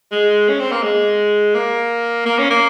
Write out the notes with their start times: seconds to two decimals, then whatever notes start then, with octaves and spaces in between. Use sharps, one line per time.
0.12 G#3
0.49 C#4
0.60 C4
0.72 A#3
0.83 G#3
1.55 A#3
2.26 A#3
2.39 C#4
2.51 A#3